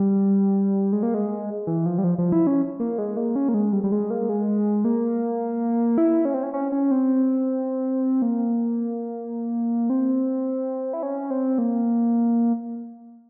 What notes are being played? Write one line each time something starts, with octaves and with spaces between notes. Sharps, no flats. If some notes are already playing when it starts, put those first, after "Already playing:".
Already playing: G3
G#3
A#3
G#3
E3
F3
G3
F3
F3
E4
C#4
A#3
G#3
A#3
C#4
A#3
G#3
G3
G3
G#3
A#3
G#3
A#3
E4
C#4
C4
C#4
C#4
C#4
C4
A#3
C4
E4
C#4
C4
A#3